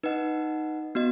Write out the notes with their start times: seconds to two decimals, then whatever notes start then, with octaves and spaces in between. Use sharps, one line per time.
0.03 D#4 B4 D#5 F#5
0.95 B3 F#4 D#5